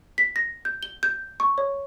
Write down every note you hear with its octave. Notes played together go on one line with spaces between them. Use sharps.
B6
A#6
G6
G7
G6
C#6
C#5